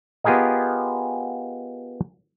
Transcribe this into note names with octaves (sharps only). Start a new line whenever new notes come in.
B3 F4 G4 G#4 A#4 D#5